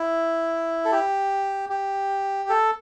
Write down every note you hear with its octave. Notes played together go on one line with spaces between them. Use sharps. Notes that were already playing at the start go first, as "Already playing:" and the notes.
Already playing: E4
A4
G4
G4
A4